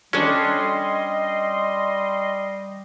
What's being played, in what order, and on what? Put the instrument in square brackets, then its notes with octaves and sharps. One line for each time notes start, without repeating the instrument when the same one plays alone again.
[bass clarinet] G3 [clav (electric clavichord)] C#4 [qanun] D4 A4 G#5 [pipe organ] D#5 C6